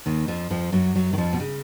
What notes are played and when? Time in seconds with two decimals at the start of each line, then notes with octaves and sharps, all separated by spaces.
0.06 D#2 D#3
0.28 F2 F3
0.50 F2 F3
0.72 F#2 F#3
0.95 F#2 F#3
1.13 D#3
1.18 F2 F3
1.33 B2
1.40 C#3